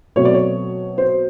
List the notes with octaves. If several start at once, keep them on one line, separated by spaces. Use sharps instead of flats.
B2 F#3 A3 C4 C#5
D5
C#5
C5